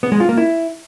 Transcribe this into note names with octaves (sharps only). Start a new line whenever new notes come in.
B3
G#3
F4
A#3
E4